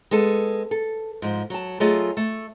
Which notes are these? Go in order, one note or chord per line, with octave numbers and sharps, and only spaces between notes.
G#3 B3 A4
A4
G#2 F3
F#3 A5
F#3 A3 F4 G#4 D#5
A3